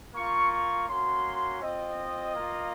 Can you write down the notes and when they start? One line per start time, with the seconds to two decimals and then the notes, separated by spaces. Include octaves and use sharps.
0.14 A#3 F4 C#6
0.51 C#6
0.88 A#3 C#4 F#4 C6
1.62 C4 F4 D#5
2.35 A#3 F4